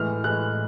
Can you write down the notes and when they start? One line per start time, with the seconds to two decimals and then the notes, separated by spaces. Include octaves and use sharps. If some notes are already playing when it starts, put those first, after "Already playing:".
Already playing: A2 E3 G#3 F6
0.24 A2 E3 G#3 F#6